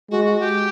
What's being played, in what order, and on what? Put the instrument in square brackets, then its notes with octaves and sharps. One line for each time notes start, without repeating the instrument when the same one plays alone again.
[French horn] G#3 [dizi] F#4
[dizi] F#4
G4